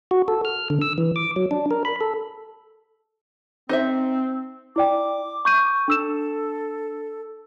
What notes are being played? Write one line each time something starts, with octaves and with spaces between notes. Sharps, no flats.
F#4
A4
F6
D3
E6
E3
D6
F#3
D4
A#4
B5
A4
C4 D#4 C5 E5
E4 D5 G5 D6
C#6 G6 D#7
D4 A4 E6 E7